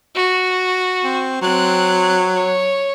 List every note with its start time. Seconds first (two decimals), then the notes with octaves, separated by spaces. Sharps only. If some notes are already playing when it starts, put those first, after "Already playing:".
0.15 F#4
1.04 C4
1.42 F#3 C4 F#6
2.35 C#5